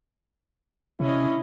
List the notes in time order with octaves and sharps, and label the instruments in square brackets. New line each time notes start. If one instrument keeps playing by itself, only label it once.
[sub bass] C3 [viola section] C#4 D4 D#5 [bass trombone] E4